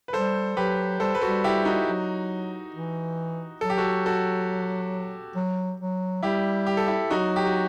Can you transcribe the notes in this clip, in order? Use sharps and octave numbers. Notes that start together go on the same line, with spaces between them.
B4
G3 A4 C5
F#3 G4 B4
G3 A4 C5
B4
F#4 A4
G3
E4 G4
D#4 F#4
F#3
E3
F#3 A4
G4
F#4 A4
F#4 A4
F#3
F#3
G3 E4 G4
G4
A4
E4 G4
F#3 D#4 F#4
G4
F#4